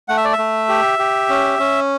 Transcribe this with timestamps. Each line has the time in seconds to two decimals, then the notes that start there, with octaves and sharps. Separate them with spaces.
0.08 A3 F#5
0.17 E5
0.25 D5
0.33 E5
0.38 A3
0.69 G4
0.99 G4
1.29 C#4
1.59 C#4